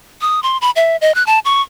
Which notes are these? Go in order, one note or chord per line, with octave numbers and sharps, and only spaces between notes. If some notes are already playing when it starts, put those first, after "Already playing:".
D#6
C6
B5
E5
D#5
F#6
A5
C#6